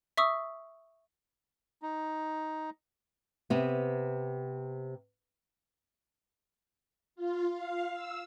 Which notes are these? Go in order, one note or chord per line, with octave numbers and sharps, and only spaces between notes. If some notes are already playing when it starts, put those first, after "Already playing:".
E5 C#6 D#6 E6
D#4
C3 B3
F4
F5
E6